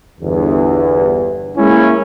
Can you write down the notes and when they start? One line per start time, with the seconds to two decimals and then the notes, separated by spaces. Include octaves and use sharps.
0.21 G1 E2
1.57 G#3 A#3 C#4 E4